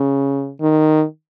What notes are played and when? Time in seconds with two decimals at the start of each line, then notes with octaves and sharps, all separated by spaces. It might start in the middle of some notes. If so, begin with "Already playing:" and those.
Already playing: C#3
0.61 D#3